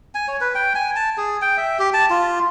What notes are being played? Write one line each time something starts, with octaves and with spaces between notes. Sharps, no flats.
G#5
C#5
B4
G5
G#5
A5
G#4
G5
E5
G4
A5
F4